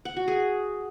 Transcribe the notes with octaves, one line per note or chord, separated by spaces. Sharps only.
F#5
F#4
G#4